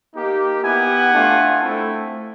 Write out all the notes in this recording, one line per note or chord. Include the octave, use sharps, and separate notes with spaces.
A#3 D#4 G4
B3 E4 G4 F#5 G#5
A3 D4 F4
A3 C4 E4